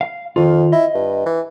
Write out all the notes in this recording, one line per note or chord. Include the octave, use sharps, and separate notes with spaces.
F5
F2 D#3 F4
E4 D#5
G2
E3